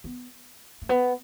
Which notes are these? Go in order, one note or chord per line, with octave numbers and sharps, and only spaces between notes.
B3
A3
B3